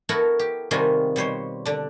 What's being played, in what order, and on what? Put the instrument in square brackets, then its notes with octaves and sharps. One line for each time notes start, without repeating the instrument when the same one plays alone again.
[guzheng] B3 E4 F#4 A4 A#4
G4
C3 D#3 G3 F4 F#4 G#4
B2 G3 C5 C#5
D3 D4